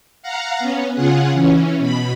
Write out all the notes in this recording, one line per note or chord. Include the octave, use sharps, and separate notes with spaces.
F5 F#5 A#5
B3 C#4
C#3 F4 G#4 F#5
E3 C#4
B2 B5